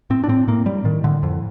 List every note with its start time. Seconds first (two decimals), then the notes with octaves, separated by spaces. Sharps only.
0.10 A2 C4
0.24 D4
0.28 A2 C4
0.48 A2 A#3
0.66 A2 G3
0.84 A2 D#3
1.04 A2 D3
1.23 F2